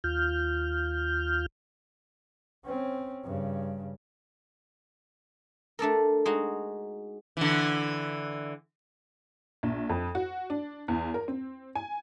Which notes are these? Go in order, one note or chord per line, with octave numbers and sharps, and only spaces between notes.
D#2 F4 F6 G6
C4 C#4
G2 C#3
A3 D4 A4 A#4
G#3 D#4 F#4
D3 E3
A#1
F2
F#4
D4
E2
A#4
C4
G#5